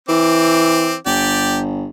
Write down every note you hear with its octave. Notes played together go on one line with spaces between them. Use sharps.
E3 C4 D6
G1 G4 D5